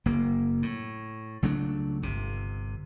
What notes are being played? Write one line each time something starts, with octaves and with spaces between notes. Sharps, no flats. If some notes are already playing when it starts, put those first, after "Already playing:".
F#1 A#3
A2
C#2 F#3 A3 D4
G1 C3